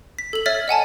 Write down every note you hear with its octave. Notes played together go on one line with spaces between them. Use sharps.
B6
A4 F#7
C#5 E5 F6 A6 B6
D#5 F#5 G#5 A5